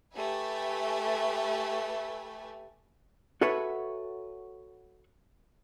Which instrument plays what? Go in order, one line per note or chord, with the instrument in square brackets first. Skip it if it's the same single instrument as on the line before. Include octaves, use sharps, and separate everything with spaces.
[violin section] A3 G4 B4 E5 G#5
[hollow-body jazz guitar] F#4 A4 B4 C#5 E5 F#5